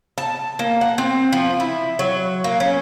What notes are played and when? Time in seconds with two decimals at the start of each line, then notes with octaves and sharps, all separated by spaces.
0.18 A5
0.59 A#3
0.81 F#5
0.98 C4
1.33 F3
1.60 E4
1.99 F#3
2.44 A#3
2.60 C#4